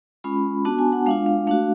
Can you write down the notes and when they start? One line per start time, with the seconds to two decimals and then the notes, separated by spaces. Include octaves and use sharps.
0.24 G#3 C#4 F4 B5
0.65 B3 D4 F#4 A5
0.79 G#5
0.92 F#5
1.06 G#3 D4 F4 F5
1.26 F5
1.47 A3 D4 F#4 F5